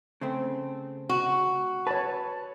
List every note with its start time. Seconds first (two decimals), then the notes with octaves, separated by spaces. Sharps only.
0.21 C#3 A3 C4
1.09 F#4
1.87 B4 C#5 A5